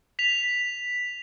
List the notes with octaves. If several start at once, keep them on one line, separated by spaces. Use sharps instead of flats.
B6 F7